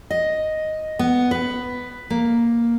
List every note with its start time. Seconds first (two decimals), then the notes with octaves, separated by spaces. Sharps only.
0.10 D#5
0.99 B3
1.31 B4
2.10 A#3